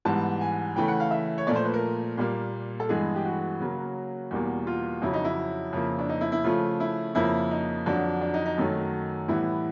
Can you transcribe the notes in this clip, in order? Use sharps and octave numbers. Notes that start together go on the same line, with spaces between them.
G#2 E3 G3 B3 A5
G#5
C#3 E3 A3 G5
F#5
F5
E5
C#5
A#2 F3 A3 D5
C5
B4
A#4
A#2 G3 A#3
A4
G2 E3 G#3 B3 G#4
G4
F#4
C#3 F#3 A#3
E2 B2 G3 A#3
F4
F2 C#3 F#3 E4
D#4
E4
F2 C#3 F3 A#3
D4
D#4
E4
E4
C#3 F3 A3 F4
E4
F2 C#3 F3 A#3 E4
D#4
F2 D3 F#3 D4
D4
D#4
D#4
F#2 D#3 F#3 A3
A2 E3 G3 B3 E4